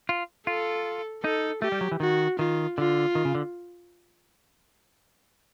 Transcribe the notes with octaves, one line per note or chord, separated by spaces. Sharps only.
F4
F4 A4
D#4 A4
A3 G4
G3
F#3
E3
D#3 F#4
D#3 F4
D3 F4
D#3
C#3
D3